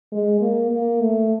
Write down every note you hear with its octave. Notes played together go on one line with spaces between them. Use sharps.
G#3
A#3
A#3
A3